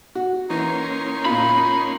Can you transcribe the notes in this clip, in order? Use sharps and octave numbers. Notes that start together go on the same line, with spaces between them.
F#4
E3 A#3 C#4 D#4 C6
A#2 F4 B5